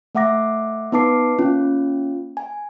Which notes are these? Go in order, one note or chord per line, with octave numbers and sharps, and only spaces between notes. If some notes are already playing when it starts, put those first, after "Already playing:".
A3 E5 F#5 D6 A#6
B3 D#4 B4 A5 D6 C7
A#3 C#4 F4
G#5